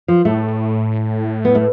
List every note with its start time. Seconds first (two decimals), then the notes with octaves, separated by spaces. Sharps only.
0.08 F3
0.25 A2 A3
1.45 B3
1.55 A3